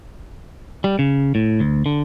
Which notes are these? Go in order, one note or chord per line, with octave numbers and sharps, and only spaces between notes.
G3
C#3
A2
D2
D3